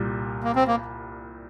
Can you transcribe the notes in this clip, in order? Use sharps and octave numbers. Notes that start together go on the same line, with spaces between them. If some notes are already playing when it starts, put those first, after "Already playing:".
Already playing: C2 A#2 G3
A#3
C4
A#3